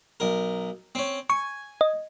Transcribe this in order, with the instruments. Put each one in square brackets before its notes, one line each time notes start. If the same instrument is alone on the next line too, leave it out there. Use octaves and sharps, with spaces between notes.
[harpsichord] B1 A#4
C4 C#4
[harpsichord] G#5 [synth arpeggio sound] C#6
[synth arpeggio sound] D#5